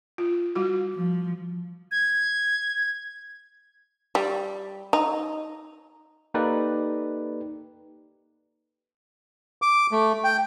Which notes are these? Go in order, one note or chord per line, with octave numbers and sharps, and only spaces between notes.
F4
G3 E4 F#4
F3
G#6
G3
D#4
A#3 D#4 G4 A4 B4 D5
D6
A3
G5